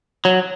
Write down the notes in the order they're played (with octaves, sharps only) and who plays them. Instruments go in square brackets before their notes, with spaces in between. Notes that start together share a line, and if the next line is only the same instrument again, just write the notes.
[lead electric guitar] F#3